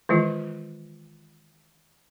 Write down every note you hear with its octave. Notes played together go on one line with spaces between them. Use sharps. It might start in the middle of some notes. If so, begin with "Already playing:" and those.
D#3 E3 G#3 F4